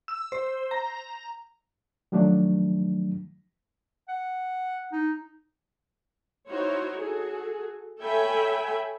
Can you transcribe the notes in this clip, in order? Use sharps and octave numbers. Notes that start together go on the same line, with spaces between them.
E6
C5
A#5
D#3 F3 F#3 A3 D4
F#5
D#4
D#4 E4 F#4 C5 C#5
F#4 G#4 A4
A4 C#5 E5 G5 G#5 B5